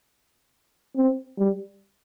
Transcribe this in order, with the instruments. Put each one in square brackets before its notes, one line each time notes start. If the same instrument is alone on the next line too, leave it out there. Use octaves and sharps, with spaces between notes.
[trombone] C4
G3